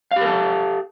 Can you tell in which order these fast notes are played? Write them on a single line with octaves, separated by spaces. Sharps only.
F5 G4 A#4 A4